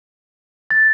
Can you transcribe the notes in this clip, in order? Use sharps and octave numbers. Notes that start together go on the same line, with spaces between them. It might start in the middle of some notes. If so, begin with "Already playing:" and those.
A6